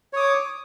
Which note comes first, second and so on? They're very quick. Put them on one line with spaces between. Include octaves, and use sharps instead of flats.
C#5 D#6 D6